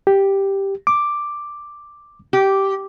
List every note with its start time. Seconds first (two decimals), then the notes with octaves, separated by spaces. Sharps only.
0.07 G4
0.87 D6
2.33 G4